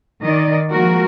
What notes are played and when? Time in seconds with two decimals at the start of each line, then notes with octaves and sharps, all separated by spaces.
0.21 D#3 D5 D#5
0.70 F3 G#3 A#3 F#4 A#4